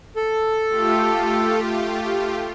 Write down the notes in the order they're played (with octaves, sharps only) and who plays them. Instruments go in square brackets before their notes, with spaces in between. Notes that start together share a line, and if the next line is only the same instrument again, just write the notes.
[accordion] A4
[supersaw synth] A3 F4 G4